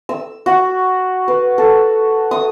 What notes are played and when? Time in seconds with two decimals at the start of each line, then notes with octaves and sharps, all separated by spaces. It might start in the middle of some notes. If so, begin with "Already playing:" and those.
0.09 E6
0.46 F#4
1.28 B4
1.58 A4
2.31 D#6